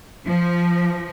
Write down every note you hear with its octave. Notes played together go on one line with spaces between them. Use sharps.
F3